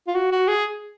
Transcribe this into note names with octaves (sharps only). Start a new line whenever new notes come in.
F4
F#4
F#4
G#4